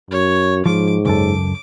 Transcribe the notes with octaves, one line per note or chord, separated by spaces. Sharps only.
F#2 C#5
G#2 F3 D6
C#2 F#2 A4 D6